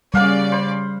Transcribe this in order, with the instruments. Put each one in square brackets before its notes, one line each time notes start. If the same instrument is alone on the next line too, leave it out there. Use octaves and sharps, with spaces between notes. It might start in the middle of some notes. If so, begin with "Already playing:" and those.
[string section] C#3 D5 [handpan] G3 [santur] A#3 F5 F#5
[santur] C5 B5